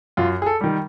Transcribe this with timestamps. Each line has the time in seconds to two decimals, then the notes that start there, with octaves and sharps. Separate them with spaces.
0.17 F#2 F4
0.42 G#4
0.46 A4
0.61 D#3 G3